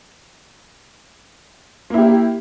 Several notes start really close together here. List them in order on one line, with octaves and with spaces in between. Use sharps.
A#3 E4 G4